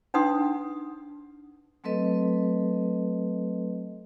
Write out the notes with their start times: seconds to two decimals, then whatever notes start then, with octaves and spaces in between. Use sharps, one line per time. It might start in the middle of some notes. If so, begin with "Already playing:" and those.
0.14 D4 D#4 B4 F#5 C6 D#6
1.84 F#3 A3 C4 A4 B4 D#5